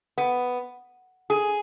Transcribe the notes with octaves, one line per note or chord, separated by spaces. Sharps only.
B3
G#4